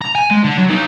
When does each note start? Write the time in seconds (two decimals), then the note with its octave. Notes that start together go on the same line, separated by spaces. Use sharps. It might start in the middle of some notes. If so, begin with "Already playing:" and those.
0.01 A#5
0.15 G#5
0.30 G#3
0.44 D3
0.57 F#3
0.69 B3 D#4